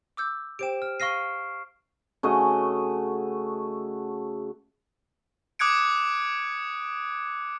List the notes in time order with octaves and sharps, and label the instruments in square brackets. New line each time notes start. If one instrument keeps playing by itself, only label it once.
[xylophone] D6 E6 G6
[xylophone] G4 C5 G5 [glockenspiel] D7 E7
[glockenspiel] F6
[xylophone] F5 A#6 D#7 [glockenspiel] C#6 F6 C7
[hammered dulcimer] C#3 A3 F#4 D#5
[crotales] D6 D#6 F#6 G#6 C#7 D7